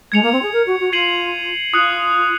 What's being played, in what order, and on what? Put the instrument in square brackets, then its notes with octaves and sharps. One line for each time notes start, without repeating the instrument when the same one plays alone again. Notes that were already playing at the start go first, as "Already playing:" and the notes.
[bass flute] G#3 [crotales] G#6 C#7 F7
[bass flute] A#3
C4
G#4
A#4
F#4
F#4
[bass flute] F4 [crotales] G#6 C7 D#7 F#7
[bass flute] F4 [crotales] D#6 F#6 C#7